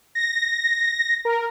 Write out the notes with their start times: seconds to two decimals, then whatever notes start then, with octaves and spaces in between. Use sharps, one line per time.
0.15 A#6
1.25 A#4